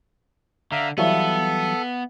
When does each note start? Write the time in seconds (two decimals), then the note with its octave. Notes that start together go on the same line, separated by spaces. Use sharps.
0.72 D3 E5 F5 A#5
0.98 E3 F#3 G3 B3 A4 E5 F5 C#6